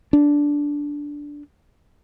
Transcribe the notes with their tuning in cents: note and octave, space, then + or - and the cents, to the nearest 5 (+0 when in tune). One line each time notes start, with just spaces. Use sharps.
D4 -10